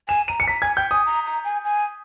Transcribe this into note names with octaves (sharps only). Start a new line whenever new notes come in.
G#5 E7
A#5 D#7
C#7
G#5
A#5 B6
G#5 G#6
G5 G6
G#5 D#6
A#5
A#5
G#5
G#5